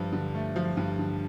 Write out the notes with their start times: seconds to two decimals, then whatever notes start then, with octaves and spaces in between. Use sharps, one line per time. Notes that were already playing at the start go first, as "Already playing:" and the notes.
Already playing: G2 F3
0.13 D3
0.35 A3
0.56 F3
0.77 G2
0.99 D3